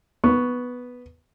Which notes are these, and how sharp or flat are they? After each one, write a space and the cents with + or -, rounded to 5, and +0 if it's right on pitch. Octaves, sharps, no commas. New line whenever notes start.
B3 +0 C#6 +5